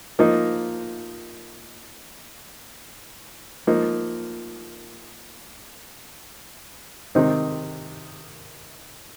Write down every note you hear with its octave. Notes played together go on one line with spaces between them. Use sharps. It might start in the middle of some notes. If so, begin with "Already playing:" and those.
F3 A#3 D#4
F3 A#3 D#4
C3 D#3 C4 D#4